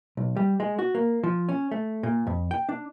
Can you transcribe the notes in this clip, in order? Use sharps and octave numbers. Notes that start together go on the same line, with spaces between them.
B1
G3
G#3
F#4
A#3
F3
C#4
A3
A#2
F2
G5
D4